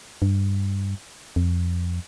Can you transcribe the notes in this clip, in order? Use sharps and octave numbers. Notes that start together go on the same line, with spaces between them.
G2
F2